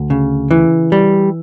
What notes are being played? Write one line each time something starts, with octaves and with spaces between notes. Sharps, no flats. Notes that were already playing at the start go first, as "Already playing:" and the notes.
Already playing: D2
C#3
E3
G3